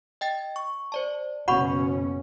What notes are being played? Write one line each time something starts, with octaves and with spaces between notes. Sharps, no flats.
D#5 G5 A6
C#6
C5 D5 A5
F#1 B2 C#4 F#4 F#5 B5 C#6